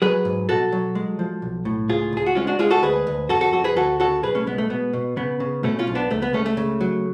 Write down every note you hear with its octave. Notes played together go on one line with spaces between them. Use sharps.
F#3 G#4 B4
G#2
B2 F#4 A4
F#3
G#3
F3
B1
A2
C#2 F4 G#4
C#2 G#4
F#4
G#3 C#4 F4
D4 F#4
G#3 F4 G#4
F#4 A4
D2 G#4 B4
D2
F2 F#4 A4
F#4 A4
F2 F#4 A4
G#4 B4
D2 F#4 A4
C#3 F#4 A4
B1 G#4 B4
A3 C#4
G#3 B3
A3
B2 B3
B2
C#3 B3
C#3
B2 A3 C#4
C#4 F4
B1
B3 D4
C#2 A3
B3
C#2 A3 C#4
A3
C#3
F#3